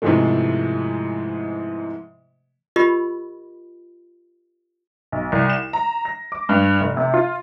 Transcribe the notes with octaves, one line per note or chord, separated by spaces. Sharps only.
G#2 C3 E3 F3 G#3 A3
F4 G4 A#4 D#5 B5
B1
C2
E7
A#5
A#6
D6
G2
F1
C3
F4